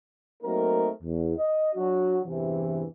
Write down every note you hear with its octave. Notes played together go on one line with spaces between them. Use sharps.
F#3 A3 A#3 C4 D#4 A#4
E2
D#5
F#3 D4 F#4
E2 G2 C3 E3